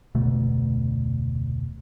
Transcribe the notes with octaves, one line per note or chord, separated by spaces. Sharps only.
F1 D2 B2 A3